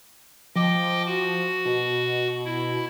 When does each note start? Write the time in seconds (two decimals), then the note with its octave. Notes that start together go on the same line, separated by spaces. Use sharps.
0.55 F3 D#5 G5 D6
1.06 F#4
1.65 B2
2.45 E4